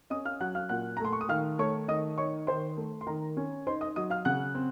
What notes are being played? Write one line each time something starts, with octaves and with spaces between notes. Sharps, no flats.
C#4 D#5 D#6
F5 F6
F#3 F#5 F#6
F5 F6
A#2 F#5 F#6
A#5
A3 C6
C#6
D#6
D#3 F5 F6
A3 C#5 C#6
D#3 D#5 D#6
D#4 C#5 C#6
D#3 C5 C6
A3
C6
D#3 A#4 A#5
C#4
D#4 C5 C6
D#5 D#6
F#3 D#5 D#6
F5 F6
C#3 F#5 F#6
C4